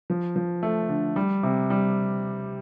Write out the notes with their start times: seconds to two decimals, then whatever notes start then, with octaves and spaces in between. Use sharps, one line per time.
0.10 F3
0.36 F3
0.63 A3
0.89 D3
1.16 G3
1.43 C3
1.70 G3